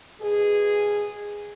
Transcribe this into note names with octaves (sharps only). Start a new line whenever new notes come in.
B2 G#4